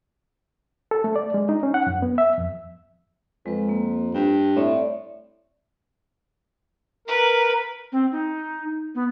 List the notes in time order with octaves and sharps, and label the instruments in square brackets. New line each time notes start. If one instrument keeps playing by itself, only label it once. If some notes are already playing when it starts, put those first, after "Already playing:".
[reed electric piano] A4
A3
D5
G#3
D#4
C#4
F#5
F#2
B3
E5
F2
[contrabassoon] F2 [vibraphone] G#3 B4
[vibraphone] A#3
[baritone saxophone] G2 [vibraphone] G5
[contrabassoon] A2 [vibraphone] C4 D5 E5
[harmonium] A#4 [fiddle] B4
[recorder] C4
D#4
B3